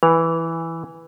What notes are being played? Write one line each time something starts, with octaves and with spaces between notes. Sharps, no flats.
E3 B4